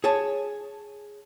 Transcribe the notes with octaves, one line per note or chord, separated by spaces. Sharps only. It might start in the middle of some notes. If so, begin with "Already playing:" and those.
G#4 C#5 A5